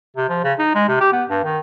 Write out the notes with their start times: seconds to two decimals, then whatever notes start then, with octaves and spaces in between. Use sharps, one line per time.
0.16 C3
0.29 F3
0.44 C#3
0.59 D#4
0.75 G#3
0.88 C3
1.01 G4
1.12 B3
1.30 G2
1.44 D#3